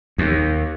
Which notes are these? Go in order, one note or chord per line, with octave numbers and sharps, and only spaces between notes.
D#2